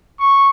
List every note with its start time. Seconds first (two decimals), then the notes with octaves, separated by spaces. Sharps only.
0.20 C#6